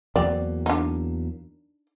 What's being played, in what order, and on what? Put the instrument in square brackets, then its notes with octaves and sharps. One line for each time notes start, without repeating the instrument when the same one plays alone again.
[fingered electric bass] E2 F#3 A#3 [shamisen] C4 D5
[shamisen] D4 D#4